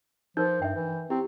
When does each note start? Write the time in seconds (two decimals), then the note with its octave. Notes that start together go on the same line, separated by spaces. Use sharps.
0.37 F3 D#4 A#4 B4 G6
0.62 G2 E5 G5
0.76 E3
1.10 C4 E4 G4